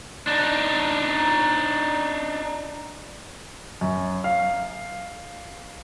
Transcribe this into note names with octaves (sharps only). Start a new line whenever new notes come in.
D4 D#4
F#2
F5